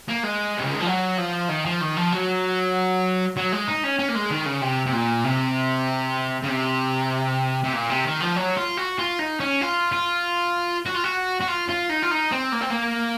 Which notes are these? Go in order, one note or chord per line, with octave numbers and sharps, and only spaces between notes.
A#3
G#3
C3
C#3
D#3
F3
F#3
F3
D#3
F3
D#3
F3
F#3
F#3
G#3
D#4
C#4
C#4
A#3
G#3
D#3
C#3
C3
C3
A#2
C3
C#3
C3
C3
A#2
C3
D#3
F3
F#3
F4
F#4
F4
D#4
C#4
F4
F4
F#4
F4
F#4
F#4
F4
F4
D#4
F4
D#4
C4
A#3
C4
A#3